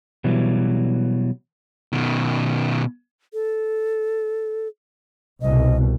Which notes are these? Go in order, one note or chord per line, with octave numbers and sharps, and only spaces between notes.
B2 E3 F#3 G3
B2 D#3
A4
C2 B2 D#5